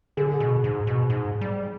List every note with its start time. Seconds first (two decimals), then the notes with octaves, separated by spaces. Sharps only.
0.17 D3 G#4
0.40 B2
0.64 G#2
0.87 B2
1.10 G#2
1.41 G3